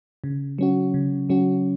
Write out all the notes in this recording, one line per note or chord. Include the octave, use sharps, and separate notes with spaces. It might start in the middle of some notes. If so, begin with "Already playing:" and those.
C#3
F#3 C#4 F#4
C#3
F#3 C#4 F#4